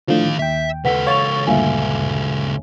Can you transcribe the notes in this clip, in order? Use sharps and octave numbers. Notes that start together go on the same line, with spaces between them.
A2 D3 D#3 F3 F5
D#2 E5 G5
C#2 A4 B4 F#5 B6
C#5 F5 C#6 A6 F7
D2 G2 A#2 E5 F5 G#5